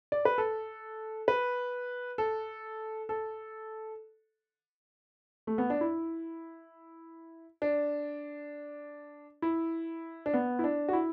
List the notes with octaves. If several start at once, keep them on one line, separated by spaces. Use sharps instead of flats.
D5
B4
A4
B4
A4
A4
A3
B3
D4
E4
D4
E4
D4
B3
E4
D4
F#4
E4